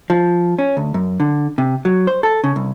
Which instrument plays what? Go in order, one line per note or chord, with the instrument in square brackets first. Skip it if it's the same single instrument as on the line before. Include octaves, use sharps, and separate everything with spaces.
[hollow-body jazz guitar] F3
C#4
D2
F#2
D3
C3
F#3
C5
A4
C#3
C2